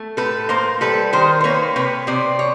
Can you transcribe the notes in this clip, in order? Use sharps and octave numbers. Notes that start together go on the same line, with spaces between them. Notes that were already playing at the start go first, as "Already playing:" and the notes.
Already playing: A3
A2 A4 B4
A#3 A#4 C5
G3 A4 B4
D#3 A#4 C5
C5
A#3 B4 C#5
C3 B4 C#5
C3 C5 D5
C#5